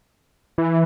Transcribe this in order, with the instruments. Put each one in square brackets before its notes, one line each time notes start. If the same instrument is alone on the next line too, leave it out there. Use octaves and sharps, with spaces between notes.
[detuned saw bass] E3